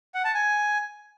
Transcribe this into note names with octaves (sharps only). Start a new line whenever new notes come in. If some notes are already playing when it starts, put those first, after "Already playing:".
F#5
A5
G#5